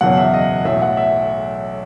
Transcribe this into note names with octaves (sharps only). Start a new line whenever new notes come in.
F#1 E2 B2 F#3 F#5
E5
D#5
B1 A2 F#3 E5
F#5
E5